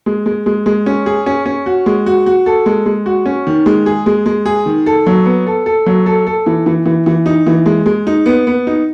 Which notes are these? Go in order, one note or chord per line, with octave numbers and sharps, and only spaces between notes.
G#3
G#3
G#3
G#3
C#4
G#4
C#4
C#4
F#4
G#3
F#4
F#4
A4
G#3
G#3
F#4
C#4
D#3
G#3
G#4
G#3
G#3
G#4
D#3
A4
F#3
B3
A4
A4
F#3
A4
A4
E3
E3
E3
E3
D#4
E3
G#3
G#3
D#4
B3
B3
D#4